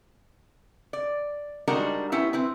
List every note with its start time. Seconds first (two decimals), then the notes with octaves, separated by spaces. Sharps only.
0.93 D5
1.68 G3 G#3 D4 D#4 F#4 A#4
2.12 B3 C#4 E4 G4
2.33 C4 E4 B4